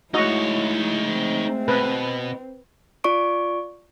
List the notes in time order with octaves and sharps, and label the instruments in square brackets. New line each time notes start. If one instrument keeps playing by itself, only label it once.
[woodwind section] G#3 A3 [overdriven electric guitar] D#4 C#5 [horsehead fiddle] E4 [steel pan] F#4 D#5
[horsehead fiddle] C4
[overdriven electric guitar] B2 [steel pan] B4
[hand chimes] F4 D5 C#6 D7